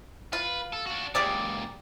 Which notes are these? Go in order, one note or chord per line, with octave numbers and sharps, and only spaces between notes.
F4 B4
A4
D4 F#4
C#2 A#2 G4 G#4 D5